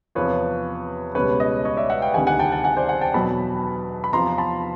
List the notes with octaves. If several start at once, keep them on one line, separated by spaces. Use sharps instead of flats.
E2 C3 F3 B4 C#5
C#2 B2 G3 B4 C#5
C#5 D#5
C#5 D#5
D5 E5
E5 F#5
F5 G5
D2 C3 D#3 G3 F#5 G#5
F#5 G#5
G5 A5
G5 A5
F#5 G#5
C5 D5
F#5 G#5
G5 A5
E2 B2 F#3 A5 B5
B5
E2 C3 F3 A#5 C6
A5 B5